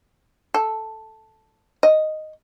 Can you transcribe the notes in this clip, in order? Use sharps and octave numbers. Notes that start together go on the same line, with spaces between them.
A4
D#5